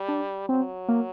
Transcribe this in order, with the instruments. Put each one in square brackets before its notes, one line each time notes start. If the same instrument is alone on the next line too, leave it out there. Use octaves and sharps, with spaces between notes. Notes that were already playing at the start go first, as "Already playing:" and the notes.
Already playing: [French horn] G3
[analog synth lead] D4
[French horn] F#3 [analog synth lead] C4
[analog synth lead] A#3